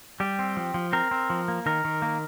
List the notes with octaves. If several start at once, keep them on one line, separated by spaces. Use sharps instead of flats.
G3 G4
C4
F3
F3
C4 A#4
C4
F3
A#3
D#3 A#4
D#3
A#3